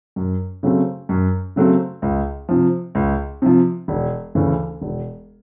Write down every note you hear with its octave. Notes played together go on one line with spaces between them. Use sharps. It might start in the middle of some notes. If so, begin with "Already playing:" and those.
F#2
C#3 F#3 A3 C4
F#2
C#3 F#3 A3 C4
C#2
C3 F3
C#2
C3 F3
E1
D2 C#3 E3
E1